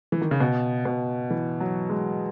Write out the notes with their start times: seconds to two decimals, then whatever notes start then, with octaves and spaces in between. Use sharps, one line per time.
0.12 E3
0.21 D#3
0.31 C#3
0.40 B2
0.85 B2
1.30 E3
1.60 F#3
1.90 G#3